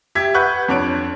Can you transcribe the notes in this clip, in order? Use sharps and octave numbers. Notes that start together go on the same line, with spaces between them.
G4 E5 G#6 B6
B4 F#5 C#6 F#6 G6
F2 D4 C#5 D7